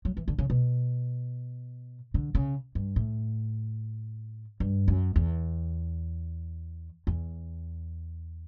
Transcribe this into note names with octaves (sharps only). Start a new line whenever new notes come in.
F#3
E3
D3
C#3
B2
D3
C#3
G2
A2
G2
F#2
E2
E2